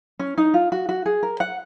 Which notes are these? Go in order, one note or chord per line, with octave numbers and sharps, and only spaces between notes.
C#4
D#4
F4
F#4
F#4
G#4
A#4
F#5